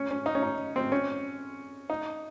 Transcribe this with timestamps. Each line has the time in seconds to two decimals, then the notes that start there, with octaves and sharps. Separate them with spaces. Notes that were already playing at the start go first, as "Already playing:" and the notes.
Already playing: C#4
0.11 C#4
0.26 D#4
0.35 C#4
0.43 D#4
0.76 C4
0.92 C#4
1.90 D#4